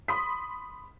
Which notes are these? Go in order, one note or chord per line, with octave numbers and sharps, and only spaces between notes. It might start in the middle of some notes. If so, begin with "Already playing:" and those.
B5 C6 D#6 B6